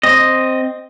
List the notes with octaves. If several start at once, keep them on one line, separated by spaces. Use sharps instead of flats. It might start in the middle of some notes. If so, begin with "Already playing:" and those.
C4 D#5